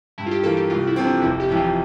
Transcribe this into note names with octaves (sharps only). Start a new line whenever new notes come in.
G2 E4
F4
G4
E3 A#3 A4
G4
C2 F4
E4
C3 F3 C4
D4
D4
F1 E4
G4
F2 C3 E3 E4
F4